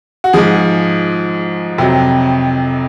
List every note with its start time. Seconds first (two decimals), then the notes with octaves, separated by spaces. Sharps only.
0.24 F#4
0.33 G#2 F3 G#4
1.78 F2 C3 F#3